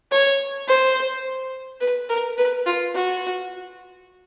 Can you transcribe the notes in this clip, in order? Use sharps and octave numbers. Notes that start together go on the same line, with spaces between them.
C#5
C5
B4
A#4
B4
F4
F#4